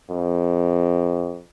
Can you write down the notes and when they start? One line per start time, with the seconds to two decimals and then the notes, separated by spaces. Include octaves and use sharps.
0.11 F2